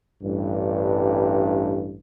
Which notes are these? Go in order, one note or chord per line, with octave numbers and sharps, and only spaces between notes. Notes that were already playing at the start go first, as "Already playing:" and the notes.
A1 G2